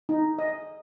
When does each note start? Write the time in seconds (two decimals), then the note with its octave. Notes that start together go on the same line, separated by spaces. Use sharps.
0.09 D#4
0.39 D#5